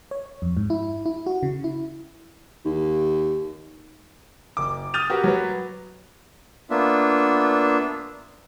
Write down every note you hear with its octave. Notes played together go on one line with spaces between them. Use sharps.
C#5
F2
G#2
E4
E4
F#4
C#3
E4
D#2
F#1 D6
D#6 F6 G6 A6 D#7 F7
F#4 G4 A#4 B4 F#5
F#3 B4
A#3 B3 D4 F4 E5